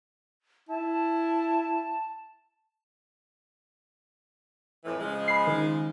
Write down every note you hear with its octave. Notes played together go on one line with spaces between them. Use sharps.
E4 A5
F2 A2 E3
C#3 F3 G#3
B5 C7
D#3